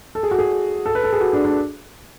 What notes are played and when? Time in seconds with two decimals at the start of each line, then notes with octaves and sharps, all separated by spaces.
0.15 A4
0.23 G#4
0.31 F#4
0.39 G#4
0.86 A4
0.95 B4
1.04 A4
1.13 G#4
1.21 F#4
1.33 D4
1.45 D4